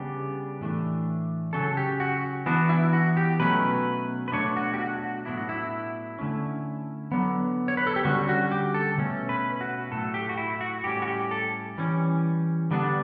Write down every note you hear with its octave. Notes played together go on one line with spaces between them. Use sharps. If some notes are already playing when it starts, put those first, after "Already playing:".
Already playing: C#3 G3 B3 D4 G4
A2 E3 A3 D4
C#3 F#3 C#4 A4
G4
F#4
E3 B3 D4 F#4
E4
F#4
G4
B2 F#3 A3 C#4 B4
B4
B2 F#3 A3 D4 C#5
F#4
G4
F#4
F#4
A2 F#3 B3 D4 E4
F#4
E4
D3 A3 C#4
D3 F#3 B3
C#5
B4
A4
G4
D3 G3 C#4 F#4
F#4
G4
A4
B2 A3 C#4
B4
F#4
A2 F#3 A3 A4
G4
F#4
E4
F#4
A2 G3 C#4 G4
F#4
G4
A4
E3 G3 C#4
D3 G3 B3 D4